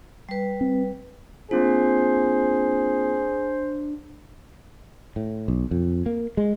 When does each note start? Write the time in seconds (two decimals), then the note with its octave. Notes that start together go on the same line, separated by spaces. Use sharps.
0.29 G3 B4
0.61 C4
1.51 A#3 C4 D4 F4 G#4 C5
5.16 A2
5.48 B1
5.71 F2
6.06 A#3
6.37 G#3